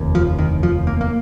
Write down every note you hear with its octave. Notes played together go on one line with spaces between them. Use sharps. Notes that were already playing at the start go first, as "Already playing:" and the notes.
Already playing: F1 D#2
F3
D#3
F3
A#3
A#3